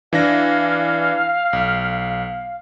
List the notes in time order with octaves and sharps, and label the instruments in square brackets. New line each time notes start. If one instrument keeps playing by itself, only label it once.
[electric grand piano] E3 D4 A#6 [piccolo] F5
[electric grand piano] B1